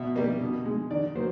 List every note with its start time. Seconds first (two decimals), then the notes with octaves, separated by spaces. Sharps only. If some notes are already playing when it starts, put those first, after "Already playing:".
Already playing: B2 E5
0.16 G3 A#3 D#5
0.41 B2
0.66 G#3
0.91 D#3 D5
1.15 F#3 A#3 C5